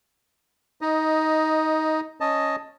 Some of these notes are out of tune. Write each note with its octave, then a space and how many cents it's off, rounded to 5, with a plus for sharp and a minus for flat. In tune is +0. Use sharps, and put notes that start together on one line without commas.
D#4 +15 D#5 +0
C#4 +0 D#5 +0 A5 +10